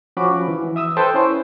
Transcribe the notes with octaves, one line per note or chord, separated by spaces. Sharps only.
F3 C#4 F#4 B5 D6
E3
E5 D#6 E6
A4 B4 C5 G5 A5
C#4 E4 C5